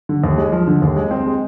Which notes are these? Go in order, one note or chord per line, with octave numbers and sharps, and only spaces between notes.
D3
D#2
G#3
F3
D3
D#2
G#3
C4
G#3